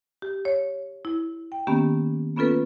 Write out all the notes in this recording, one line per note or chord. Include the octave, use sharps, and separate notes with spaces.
G4
C#5
E4
G5
D#3 A#3 B3 C#4 G4
A#3 B3 C#4 F4 A4 B4